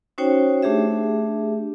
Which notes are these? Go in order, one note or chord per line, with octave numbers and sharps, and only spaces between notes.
C#4 D#4 F#4 C5 C#5 G5
A3 D4 G4 G#4 E5